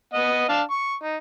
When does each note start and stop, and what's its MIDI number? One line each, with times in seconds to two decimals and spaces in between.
0.13 0.46 59
0.13 0.46 75
0.13 0.46 78
0.49 0.62 62
0.49 0.62 77
0.49 0.62 81
0.70 0.94 85
1.03 1.16 63